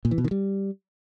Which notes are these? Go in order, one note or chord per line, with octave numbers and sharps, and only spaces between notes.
A#2
E3
B2
D#3
G3